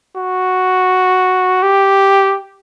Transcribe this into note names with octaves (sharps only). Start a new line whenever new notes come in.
F#4
G4